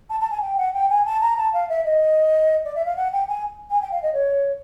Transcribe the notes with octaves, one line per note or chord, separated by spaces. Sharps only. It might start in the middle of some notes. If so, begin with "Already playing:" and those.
A5
A5
G#5
G5
F#5
G5
G#5
A5
A#5
A5
F5
E5
D#5
D5
E5
F5
F#5
G5
G#5
G#5
G5
F5
D#5
C#5